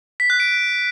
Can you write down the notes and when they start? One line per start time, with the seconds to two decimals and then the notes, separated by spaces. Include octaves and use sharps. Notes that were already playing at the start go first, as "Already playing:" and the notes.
0.20 B6
0.30 F#6
0.40 D7